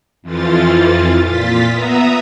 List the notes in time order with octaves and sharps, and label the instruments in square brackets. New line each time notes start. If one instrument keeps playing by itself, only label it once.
[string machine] F2 E3 F3 F4 A6
A#2 F4 A6 B6
B3 E5 A#5 D#6